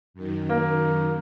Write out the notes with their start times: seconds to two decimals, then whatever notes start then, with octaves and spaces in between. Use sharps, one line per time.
0.14 F#2 D#3
0.49 A#3